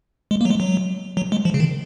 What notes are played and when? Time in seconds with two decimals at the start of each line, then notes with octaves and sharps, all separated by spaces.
0.31 G#3
0.41 A#3
0.45 F#3
0.50 G#3
0.60 F#3
1.17 F#3
1.32 G#3
1.45 F3
1.54 C#3
1.60 D#3